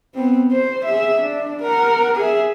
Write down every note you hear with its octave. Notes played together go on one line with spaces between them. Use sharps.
B3 C4
C5
G#4 E5
D4
A#4 F#5
G#4 E5